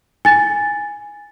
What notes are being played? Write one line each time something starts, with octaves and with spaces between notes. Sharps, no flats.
G#5 A6